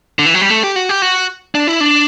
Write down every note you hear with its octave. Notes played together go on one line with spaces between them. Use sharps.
D3
E3
F#3
G3
A3
G4
F#4
G4
F#4
D4
E4
D4